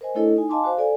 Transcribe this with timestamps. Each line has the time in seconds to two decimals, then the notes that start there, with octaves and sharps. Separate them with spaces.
0.01 A#4 C5 D#5 G#5
0.15 A3 D4 E4 A4 C#5 D#5
0.36 D#4 G#5
0.49 D#5 F5 G#5 A5 C6 D6
0.64 F#4 C5 F5
0.77 A4 D5 G#5